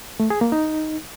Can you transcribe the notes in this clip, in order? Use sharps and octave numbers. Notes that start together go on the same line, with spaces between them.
A3
G#4
A#3
D#4